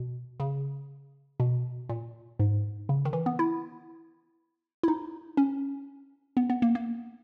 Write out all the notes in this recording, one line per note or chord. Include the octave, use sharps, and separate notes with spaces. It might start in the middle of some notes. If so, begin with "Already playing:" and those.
Already playing: B2
C#3
B2
A#2
G#2
C#3
D#3
E3
B3
E4
E4
D#4
C#4
B3
B3
A#3
A#3